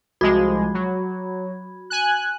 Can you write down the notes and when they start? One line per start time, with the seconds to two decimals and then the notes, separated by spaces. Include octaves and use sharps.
0.21 C2 F3 G#3 F#4 B5 G#6
0.74 F#3
1.90 G#5 F#6